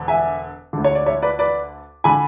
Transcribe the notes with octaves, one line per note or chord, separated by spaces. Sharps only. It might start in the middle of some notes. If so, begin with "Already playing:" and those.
Already playing: E1 D3
E5 G#5
D2 D3
C#5
D5
C#5 E5
B4 D5
B4 D5
D3 G#5 B5